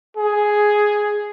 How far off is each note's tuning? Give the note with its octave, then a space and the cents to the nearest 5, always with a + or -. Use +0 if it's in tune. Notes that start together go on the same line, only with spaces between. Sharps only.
G#4 +5